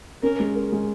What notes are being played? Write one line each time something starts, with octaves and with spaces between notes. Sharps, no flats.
C#4 A#4
G#3
A#4
G#3